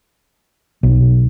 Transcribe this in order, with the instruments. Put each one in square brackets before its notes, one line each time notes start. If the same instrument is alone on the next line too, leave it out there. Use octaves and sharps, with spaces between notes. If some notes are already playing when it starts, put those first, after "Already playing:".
[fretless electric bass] B1